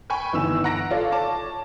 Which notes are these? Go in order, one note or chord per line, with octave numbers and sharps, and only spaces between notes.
G5 G#5 B5 C#6
G1 D#3 E3 E6 E7
F#5 A#5 A#6 D7
F4 A4 C#5 D5 F5
C#5 A5 D6